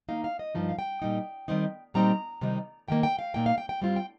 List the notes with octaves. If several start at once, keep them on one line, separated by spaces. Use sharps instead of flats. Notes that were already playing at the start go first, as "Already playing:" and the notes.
D#3 A#3 D#4 F5
F5
D#5
G2 F3 D#4
F5
G5
A#2 G3 D#4
D#3 G3 C4 D#4
A#2 G3 C4 D#4 A#5
C3 D#3 G3 D#4
C3 D#3 A#3 G5
G5
F5
A#2 A#3 D#4 G5
F5
G5
G5
G2 G3 C4 F4
G5